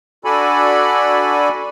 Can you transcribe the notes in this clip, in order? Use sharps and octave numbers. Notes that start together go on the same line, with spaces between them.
D4 F#4 A4 D5 G#5 B5